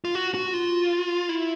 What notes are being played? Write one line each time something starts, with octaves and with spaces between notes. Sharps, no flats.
F4
F#4
F#4
F4
E4